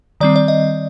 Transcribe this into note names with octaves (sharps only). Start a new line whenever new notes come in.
D#3 G3 C4 D5
D5
D#5